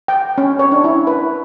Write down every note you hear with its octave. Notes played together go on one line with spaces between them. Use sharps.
G5
C#4
C#5
D4
E4
B4